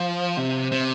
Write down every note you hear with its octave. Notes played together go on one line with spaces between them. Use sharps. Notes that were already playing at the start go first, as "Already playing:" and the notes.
Already playing: F3
C3
C3